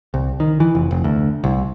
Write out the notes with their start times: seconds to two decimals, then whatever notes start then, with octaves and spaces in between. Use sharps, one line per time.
0.14 C2
0.40 D#3
0.60 E3
0.75 F1
0.91 F1
1.04 D2
1.44 C2